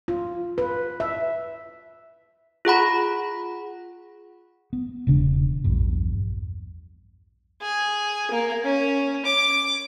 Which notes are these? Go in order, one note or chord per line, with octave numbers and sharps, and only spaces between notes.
F4
B4
E5
F4 G#4 F#5 B5
B3
E1 C#3 D4
A#1 E2 G2
G#4
A#3
C#4
D6